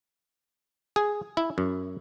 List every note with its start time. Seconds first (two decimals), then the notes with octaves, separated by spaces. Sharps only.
0.96 G#4
1.37 E4
1.58 F#2